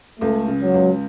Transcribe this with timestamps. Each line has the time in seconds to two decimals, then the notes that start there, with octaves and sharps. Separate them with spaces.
0.20 C#2 A3
0.48 C#3
0.61 F#3
0.74 C#2